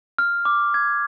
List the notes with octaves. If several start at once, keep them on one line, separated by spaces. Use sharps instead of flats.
F6
D6
G#6